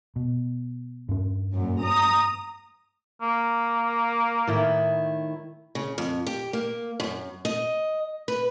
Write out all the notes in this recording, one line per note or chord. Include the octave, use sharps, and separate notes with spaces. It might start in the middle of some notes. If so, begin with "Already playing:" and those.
B2
G2 C#4
F#2 A#2
A#5 D#6
A#3
A2 D#3 E4
C#3
F2
G4
A#3
F#2
D#5
B4